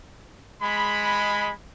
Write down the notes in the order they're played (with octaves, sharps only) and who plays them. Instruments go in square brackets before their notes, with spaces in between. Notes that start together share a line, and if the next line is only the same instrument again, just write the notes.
[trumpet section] G#3 B5